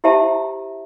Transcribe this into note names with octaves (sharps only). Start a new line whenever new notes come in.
E4 G4 C5 E5 A5 A#5